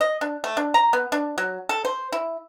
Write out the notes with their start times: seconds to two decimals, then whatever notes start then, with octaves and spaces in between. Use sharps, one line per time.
0.01 D#5
0.21 D4
0.44 A3
0.57 D4
0.74 A#5
0.93 B3
1.12 D4
1.38 F#3
1.69 A4
1.85 C5
2.12 E4